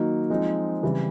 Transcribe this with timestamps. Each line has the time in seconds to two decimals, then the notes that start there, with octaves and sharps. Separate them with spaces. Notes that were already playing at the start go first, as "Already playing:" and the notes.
Already playing: D#3 F#3 A#3 D#4
0.30 F3 G#3 C4 D#4
0.83 C#3 E3 G3 C4 E4